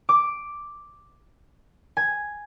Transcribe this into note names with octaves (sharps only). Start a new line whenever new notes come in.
D6
G#5